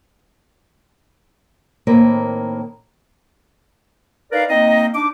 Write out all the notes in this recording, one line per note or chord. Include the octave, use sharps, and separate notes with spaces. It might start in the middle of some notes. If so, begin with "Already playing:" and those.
A2 D#3 A#3 C4 B4
D#4 A#4 B4 D5 F5
A#3 C4 D#4 D#5
D4 D#4 D6